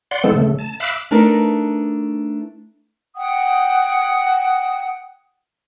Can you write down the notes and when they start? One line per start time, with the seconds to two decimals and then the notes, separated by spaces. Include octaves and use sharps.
0.11 D5 F#5 C6
0.24 E3 G#3 B3 C4 A4
0.36 C#3 A3
0.59 A5
0.80 E5 F5 B5 D6 E6 F#6
1.11 A3 D4 D#4 A#4 B4
3.16 F#5 G5 D#6